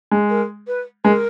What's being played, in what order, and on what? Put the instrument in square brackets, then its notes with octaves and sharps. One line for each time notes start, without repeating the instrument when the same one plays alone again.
[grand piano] G#3
[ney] A#4
B4
[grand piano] G#3 [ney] B4
[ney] A#4